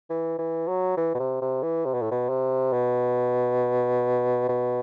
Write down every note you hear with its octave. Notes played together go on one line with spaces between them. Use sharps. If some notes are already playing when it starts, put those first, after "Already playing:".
E3
E3
F#3
E3
B2
C3
C3
E3
C3
B2
A2
B2
C3
B2
B2